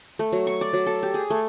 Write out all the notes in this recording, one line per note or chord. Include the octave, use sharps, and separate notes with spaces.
A3
F#3
C#6
D5
F#3
A4
G4
G#4
A3